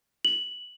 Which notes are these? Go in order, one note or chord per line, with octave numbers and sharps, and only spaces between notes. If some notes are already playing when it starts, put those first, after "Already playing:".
F#7